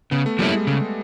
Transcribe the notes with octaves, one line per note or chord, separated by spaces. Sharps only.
C#3 B3
A3
F3 G3 A#3 C#4 E4
G#3
C#3 A3